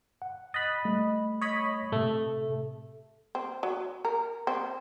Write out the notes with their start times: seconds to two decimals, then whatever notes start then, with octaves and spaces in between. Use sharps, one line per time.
0.22 F#5
0.54 D#5 B5 F#6 A6
0.85 G3 A3
1.41 C#5 D#5 B5
1.92 A2 C3 A3
3.35 C4
3.63 F#3
4.05 A#4
4.47 C4